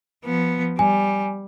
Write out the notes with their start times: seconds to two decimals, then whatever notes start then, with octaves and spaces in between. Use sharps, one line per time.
0.25 F3 B3
0.79 G3 G#5